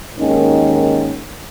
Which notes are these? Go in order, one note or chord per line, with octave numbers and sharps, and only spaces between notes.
D#2 G#2 D#3 C#4